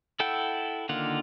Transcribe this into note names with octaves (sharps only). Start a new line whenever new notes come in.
E4 A4 F#5 G5
D3 D#3 A#3 F4 F#5